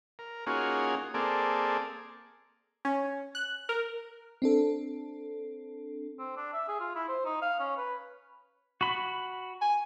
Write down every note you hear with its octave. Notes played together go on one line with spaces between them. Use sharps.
A#4
A#3 C#4 D#4 F4 F#4 G#4
A#3 C4 G#4 A4 D5
C#4
F#6
A#4
C4 D4 A4
C4
D4
E5
G#4
F4
E4
C5
D#4
F5
C#4
B4
F#4 B5
G#5